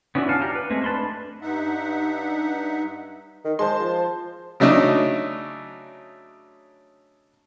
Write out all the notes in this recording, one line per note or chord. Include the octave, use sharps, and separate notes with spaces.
B3 C#4 D4 E4 F#4
F5 F#5 G#5 A5 F6
G4 A#5 F6
B4
G#3 A3 C4
D4 B4 A5 B5 C6
G2 D#4 E5 F#5
D#3
G#3 C5 A5 C6
F3
C#3 F#3 A3 D4 D#4